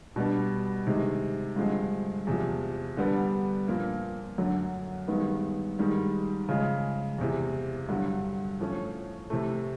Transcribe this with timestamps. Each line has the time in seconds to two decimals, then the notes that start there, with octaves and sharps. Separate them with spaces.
0.16 B2 G3 B3 D4
0.86 C3 D#3 G#3
1.56 G2 D3 F3 G#3 C4
2.27 E2 C3 F3
2.97 D3 G3 B3 D4
3.68 A#2 F3 A#3
4.38 F#2 D3 F#3
5.08 G2 D#3 G#3 B3
5.79 G#2 D#3 G3
6.49 C#3 F3 G#3
7.18 E2 C3 E3
7.89 G2 D3 F#3
8.60 A2 F3 A3 C#4
9.30 C3 E3 A3